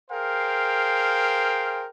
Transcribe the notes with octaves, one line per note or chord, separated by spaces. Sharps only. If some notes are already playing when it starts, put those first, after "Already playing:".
G#4 A#4 C5 F5 G5